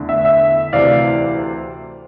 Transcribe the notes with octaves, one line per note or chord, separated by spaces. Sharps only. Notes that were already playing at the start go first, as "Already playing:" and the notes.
Already playing: E2 D3 A3
E5
E5
D2 C3 E3 D5 F5